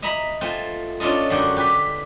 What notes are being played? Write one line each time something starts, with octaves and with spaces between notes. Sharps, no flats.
D#5 E5 A#5 B5
A3 C4 F4 G#5
C#4 D4 F4 A4 D#5
F#2 D3 G#3 F#4 D5 G5
G4 B4